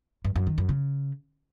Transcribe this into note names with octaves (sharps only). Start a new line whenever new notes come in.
G2
F#2
D#3
F#2
C#3